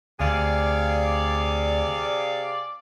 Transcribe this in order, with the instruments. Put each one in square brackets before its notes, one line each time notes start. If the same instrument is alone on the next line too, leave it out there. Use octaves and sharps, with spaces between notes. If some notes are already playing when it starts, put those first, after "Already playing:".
[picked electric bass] D2 [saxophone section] C3 G#4 F5 [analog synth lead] D5